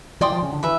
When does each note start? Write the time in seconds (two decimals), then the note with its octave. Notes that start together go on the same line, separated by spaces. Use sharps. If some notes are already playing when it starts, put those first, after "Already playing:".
0.21 E3 D5 G5 C6 D#6
0.32 F3
0.42 C#3
0.53 D3
0.63 E3 B4 E5